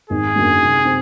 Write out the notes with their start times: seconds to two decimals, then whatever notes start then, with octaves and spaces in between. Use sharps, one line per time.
0.10 G#1 G#4
0.35 F#2 D3 F#3 A#3
0.60 C3
0.85 C4